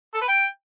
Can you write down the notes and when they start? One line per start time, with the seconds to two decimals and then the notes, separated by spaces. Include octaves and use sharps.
0.14 A4
0.21 B4
0.28 G5